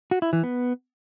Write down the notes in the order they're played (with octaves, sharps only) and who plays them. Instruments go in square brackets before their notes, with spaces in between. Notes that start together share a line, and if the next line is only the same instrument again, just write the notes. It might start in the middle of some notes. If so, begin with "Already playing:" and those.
[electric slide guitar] F#4
E4
E3
B3